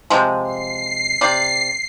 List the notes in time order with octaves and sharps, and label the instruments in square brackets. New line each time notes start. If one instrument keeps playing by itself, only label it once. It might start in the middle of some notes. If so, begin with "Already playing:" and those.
[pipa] C3 F3 G#3
[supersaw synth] C7
[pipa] C3 D5